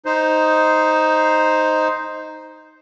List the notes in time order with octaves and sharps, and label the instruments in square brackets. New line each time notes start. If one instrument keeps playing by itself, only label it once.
[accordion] D#4 C5